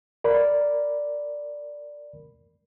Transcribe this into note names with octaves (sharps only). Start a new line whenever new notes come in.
A#4 D5 B5